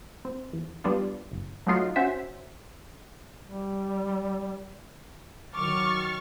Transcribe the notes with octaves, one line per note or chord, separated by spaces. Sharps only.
C4
E2
G3 B3 D4 F4
G1
F#3 A3 D#4 F4 F#4
C#4 F#4 C5 E5
G3
D#3 F#3 C#6 D6 F6 A6